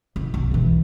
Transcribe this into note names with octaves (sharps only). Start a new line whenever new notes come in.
C2
B1
G#2 E3